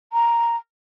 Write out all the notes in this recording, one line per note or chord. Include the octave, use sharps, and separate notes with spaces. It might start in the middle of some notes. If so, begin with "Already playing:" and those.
A#5